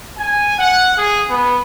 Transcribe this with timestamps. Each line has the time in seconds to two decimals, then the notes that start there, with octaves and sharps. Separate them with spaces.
0.18 G#5
0.59 F#5
0.98 G#4
1.30 B3